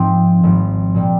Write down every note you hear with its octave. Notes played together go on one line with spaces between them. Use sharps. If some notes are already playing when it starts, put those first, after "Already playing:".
Already playing: G#2 F3 C4
G#1 G#2 F3
A#2 G3 A#3